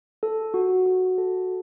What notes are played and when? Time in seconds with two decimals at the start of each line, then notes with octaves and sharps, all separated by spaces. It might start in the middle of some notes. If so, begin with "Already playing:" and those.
0.23 A4
0.54 F#4
0.86 F#4
1.18 A4